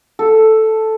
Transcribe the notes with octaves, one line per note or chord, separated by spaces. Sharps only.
A4